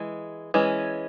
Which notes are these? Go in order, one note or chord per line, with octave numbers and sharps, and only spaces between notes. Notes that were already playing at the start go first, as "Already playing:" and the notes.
Already playing: E3 G#3
E3 G#3 C#4